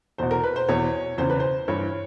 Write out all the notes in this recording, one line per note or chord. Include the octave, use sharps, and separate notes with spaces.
E2 B2 C5
A#4
B4
C5
E2 B2 C#5
E2 C#3 E3 C5
B4
C5
G2 E3 C#5